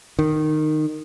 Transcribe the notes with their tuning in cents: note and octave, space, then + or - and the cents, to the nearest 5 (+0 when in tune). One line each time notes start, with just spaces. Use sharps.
D#3 -15